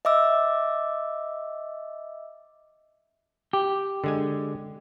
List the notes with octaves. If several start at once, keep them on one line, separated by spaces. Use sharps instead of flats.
D#5 E5 D6 E6
G4
D3 G#3 G#5